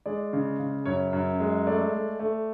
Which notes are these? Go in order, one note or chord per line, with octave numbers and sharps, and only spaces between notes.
G#3 D5
C#3
C#3
F#2 C#5
F#2
G#3
A3 D5
A3
A3